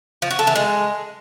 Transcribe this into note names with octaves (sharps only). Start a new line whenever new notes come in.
F3
F#4
A4
E3
G#3